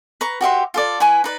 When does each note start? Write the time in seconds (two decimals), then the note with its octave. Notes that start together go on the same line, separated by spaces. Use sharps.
0.21 B4 A#5 C#6
0.41 F#4 G4 E5 C6
0.74 F4 A4 D5
1.00 E4 B4 G#5 C#6
1.24 D#4 B4 D5